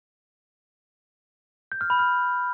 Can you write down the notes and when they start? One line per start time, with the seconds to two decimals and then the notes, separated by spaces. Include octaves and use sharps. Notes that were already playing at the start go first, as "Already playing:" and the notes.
1.72 G6
1.81 F6
1.90 B5
1.99 F6